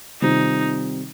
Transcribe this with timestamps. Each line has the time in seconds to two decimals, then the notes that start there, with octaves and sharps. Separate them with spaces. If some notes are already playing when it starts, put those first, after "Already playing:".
0.22 C3 D#3 G3 C4 D#4 F4